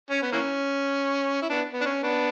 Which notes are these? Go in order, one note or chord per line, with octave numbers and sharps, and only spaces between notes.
C#4
B3
E3 A#3 C#4
E4
B3 D4
B3
D4
C#4
B3 D4